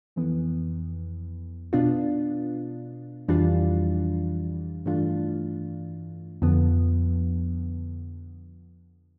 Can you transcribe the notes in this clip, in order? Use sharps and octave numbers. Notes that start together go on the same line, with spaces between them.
F2 E3 B3
B2 B3 D4 F4
F2 E3 G3 D4 F4
G2 E3 A3 D4 F4
F2 D3 F3 B3